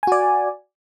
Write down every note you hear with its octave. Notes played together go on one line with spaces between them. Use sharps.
F#4 D5 G#5